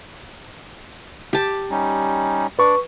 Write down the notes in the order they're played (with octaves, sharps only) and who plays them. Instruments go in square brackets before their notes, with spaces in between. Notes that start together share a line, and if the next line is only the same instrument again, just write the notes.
[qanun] G4 A5
[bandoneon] G3 C#4 D#4
[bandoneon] D4 D5 [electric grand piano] B4 C#6